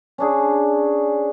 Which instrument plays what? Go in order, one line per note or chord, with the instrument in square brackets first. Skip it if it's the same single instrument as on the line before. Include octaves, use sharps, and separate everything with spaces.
[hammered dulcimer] C#4 D4 G#4